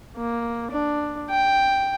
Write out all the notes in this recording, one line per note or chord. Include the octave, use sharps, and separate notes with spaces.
A#3
D4
G5